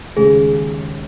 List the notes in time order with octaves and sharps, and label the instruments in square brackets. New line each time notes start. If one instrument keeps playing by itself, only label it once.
[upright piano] D#2 C#3 G#3 [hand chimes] G#4